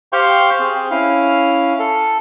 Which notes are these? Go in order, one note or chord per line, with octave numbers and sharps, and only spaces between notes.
G4 C5 F5 G5 C6 C#6
C4 G#4
C#4 E4 F5
A4